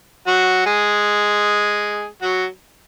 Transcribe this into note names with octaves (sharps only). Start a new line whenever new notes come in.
F#3 F#4
G#3 G#4
F#3 F#4